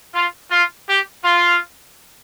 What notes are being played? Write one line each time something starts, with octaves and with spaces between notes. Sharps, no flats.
F4
F4
G4
F4